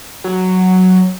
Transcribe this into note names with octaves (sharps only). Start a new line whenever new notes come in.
F#3